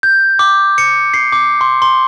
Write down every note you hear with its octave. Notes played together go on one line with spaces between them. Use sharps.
G6
D6
C#7
C7
D6
C6
C6